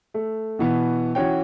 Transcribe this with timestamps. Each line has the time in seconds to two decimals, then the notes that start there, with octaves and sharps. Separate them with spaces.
0.14 A3
0.59 B2 E3 B3
1.15 E3 C#4 F#4 C#5 G5